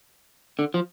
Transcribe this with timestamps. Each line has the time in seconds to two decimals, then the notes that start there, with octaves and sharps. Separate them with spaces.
0.59 D3
0.74 F3